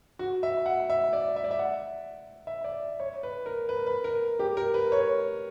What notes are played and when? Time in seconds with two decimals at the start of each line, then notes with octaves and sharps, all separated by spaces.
0.19 F#4
0.43 E5
0.66 F#5
0.90 E5
1.13 D5
1.36 E5
1.44 D5
1.51 E5
1.59 F#5
2.47 E5
2.64 D5
3.00 C#5
3.23 B4
3.46 A#4
3.69 B4
3.86 B4
4.04 A#4
4.39 G4
4.57 A#4
4.74 B4
4.92 C#5